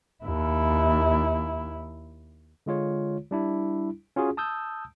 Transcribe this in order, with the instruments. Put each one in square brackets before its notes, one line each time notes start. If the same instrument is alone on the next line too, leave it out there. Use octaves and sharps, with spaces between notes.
[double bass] D#2 E4
[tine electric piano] D3 G#3 F4 C#5
G3 D4 E4
C#4 F4 F#4 G#4
A5 D#6 E6 G6